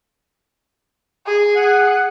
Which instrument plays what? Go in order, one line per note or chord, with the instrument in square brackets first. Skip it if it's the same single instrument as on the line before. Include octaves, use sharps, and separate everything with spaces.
[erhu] G#4
[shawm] F#5